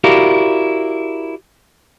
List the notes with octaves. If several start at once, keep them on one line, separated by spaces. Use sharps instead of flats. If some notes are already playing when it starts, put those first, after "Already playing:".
E4 F#4 G4 A#4 D5 F5